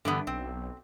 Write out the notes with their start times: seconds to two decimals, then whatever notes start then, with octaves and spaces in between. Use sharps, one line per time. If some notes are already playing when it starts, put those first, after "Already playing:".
0.05 G2 D3 E3 B3
0.27 B1 C4